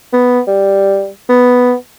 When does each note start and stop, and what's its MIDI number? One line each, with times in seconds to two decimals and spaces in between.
0.13 0.40 59
0.47 1.09 55
1.29 1.74 59